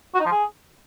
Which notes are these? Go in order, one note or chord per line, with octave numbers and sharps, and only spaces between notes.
F#4
D#4
F3
G#4